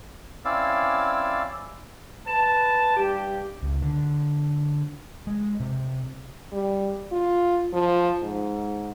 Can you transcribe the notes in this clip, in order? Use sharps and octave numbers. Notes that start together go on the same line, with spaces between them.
C4 C#4 E4 D5 F5 E6
B4 A5
G2 G4
C#2
D3
G#3
C3
G3
F4
F3
G#2